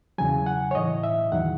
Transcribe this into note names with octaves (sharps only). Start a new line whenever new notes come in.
E2 C#3 F#3 G#5
F#5
C#5
A2 E3 D#5
E5
E2 D#3 F#3 F#5